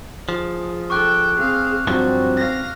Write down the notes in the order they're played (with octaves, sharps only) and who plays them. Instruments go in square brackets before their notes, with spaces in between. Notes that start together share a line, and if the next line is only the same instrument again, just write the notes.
[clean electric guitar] F3 [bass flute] G#4
[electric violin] A4 G5 [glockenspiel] C#6 D6 F#6
[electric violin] C4 F5 [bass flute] G#4
[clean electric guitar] G2 F3 F#3 [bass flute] C4 [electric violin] F#4
[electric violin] F5 A#6